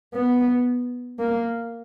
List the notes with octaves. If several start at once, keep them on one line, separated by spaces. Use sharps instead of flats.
B3
A#3